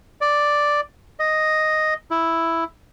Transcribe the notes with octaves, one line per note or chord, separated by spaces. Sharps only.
D5
D#5
E4